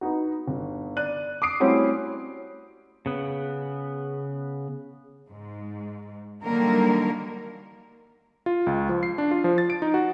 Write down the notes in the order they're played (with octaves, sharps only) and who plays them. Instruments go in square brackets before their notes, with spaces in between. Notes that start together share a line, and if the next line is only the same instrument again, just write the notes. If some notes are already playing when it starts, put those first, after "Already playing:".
[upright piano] B3 D#4 F#4
G1
D5 F#6 D#7
D6 D#6 C7 D7
G3 A3 C4 C#4 E4 F#4
[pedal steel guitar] C#3 B3
[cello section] G#2
D3 D#3 F#3 G3 A#3 A#4
[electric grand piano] F4
C#2
F3
C7
D4
F4
F3
A6
D7
D#4
F#4